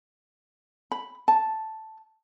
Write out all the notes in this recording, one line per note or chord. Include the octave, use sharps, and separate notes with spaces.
B5
A5